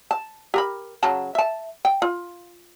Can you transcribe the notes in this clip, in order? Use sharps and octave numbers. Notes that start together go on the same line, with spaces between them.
A5
G4 A#4 B5
C#3 F#3 A5
E5 A5
G5
F4